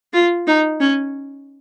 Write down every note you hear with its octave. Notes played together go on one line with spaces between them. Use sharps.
F4
D#4
C#4